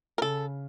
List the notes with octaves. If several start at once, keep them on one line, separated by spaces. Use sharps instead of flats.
A#4
C#3 A4